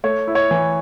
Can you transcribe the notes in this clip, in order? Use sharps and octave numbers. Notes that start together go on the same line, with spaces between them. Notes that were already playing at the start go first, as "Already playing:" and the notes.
A3 C#5
E4
C#5
E3